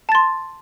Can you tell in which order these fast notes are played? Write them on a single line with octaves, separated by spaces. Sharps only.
A5 A6 C6